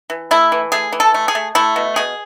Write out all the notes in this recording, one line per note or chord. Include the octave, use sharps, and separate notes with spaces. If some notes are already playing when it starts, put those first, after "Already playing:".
E3
A3 E4
E3
A3 G#4
E3
A4
A3
G#4
A3
A3 E4
B2
B2 G#4